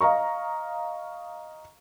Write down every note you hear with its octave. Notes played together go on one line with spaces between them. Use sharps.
D#5 F5 A#5 C#6